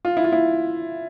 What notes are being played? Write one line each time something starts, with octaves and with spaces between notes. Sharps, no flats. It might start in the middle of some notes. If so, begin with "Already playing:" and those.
F4
E4
F4
E4